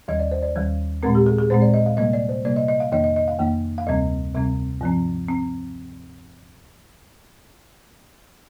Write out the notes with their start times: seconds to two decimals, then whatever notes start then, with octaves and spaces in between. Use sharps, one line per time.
0.08 D#2 D#3 G3 D#5
0.20 D5
0.31 C5
0.42 D5
0.56 D#2 D#3 G3
1.03 A#2 G#3 C4 A#4
1.15 G4
1.26 G#4
1.38 G#4
1.50 A#2 G#3 C4 C5
1.62 D5
1.74 D#5
1.86 F5
1.97 C3 G3 A#3 D#5
2.13 D5
2.29 C5
2.45 C3 G3 A#3 D5
2.56 D#5
2.68 D#5
2.80 F5
2.92 F2 D#3 A#3 D#5
3.04 D#5
3.16 D#5
3.28 F5
3.39 F2 D#3 A#3
3.78 F5
3.87 D2 C3 G3 C4 D#5
4.34 D2 C3 G3 C4
4.81 G2 F3 C4
5.28 C4